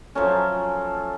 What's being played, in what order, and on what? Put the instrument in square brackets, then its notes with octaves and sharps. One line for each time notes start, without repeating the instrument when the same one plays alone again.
[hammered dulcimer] F3 F#3 A3 C#4